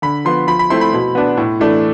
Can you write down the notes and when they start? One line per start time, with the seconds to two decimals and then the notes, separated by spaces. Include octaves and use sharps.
0.02 D3 B5
0.25 F3 B3 C6
0.47 F3 B5
0.59 B5
0.70 A3 C4 E4 C6
0.81 B5
0.93 B2
1.15 B3 D4
1.37 A2
1.60 E3 A3 D4